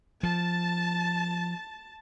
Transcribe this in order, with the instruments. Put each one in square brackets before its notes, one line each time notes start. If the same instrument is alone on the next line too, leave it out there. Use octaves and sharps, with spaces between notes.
[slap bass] F3 [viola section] A5